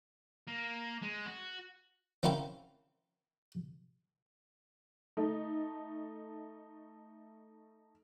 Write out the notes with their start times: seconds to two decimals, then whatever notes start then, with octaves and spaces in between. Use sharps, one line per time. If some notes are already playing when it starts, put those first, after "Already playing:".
0.47 A#3
1.02 G#3
1.26 F#4
2.23 C4 C#4 E4 A#4 F5 G5
5.17 A3 D#4